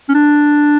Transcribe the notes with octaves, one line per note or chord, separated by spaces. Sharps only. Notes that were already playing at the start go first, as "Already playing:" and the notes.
C#4
D4